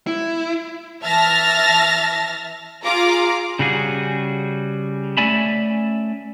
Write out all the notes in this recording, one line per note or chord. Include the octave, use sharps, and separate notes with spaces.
E4
E3 E5 A5 F6 A6 A#6
F4 G#4 F5 A#5 D6
C#3 G3 F#4 G#4
A3 C#4 D5 E5 G#5 B5